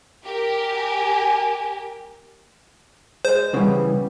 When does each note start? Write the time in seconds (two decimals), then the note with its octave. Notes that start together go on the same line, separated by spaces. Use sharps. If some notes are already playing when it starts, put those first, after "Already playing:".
0.25 G4 A#4
0.63 G#5
3.25 G#3 C5
3.54 C#3 E3 G3 B3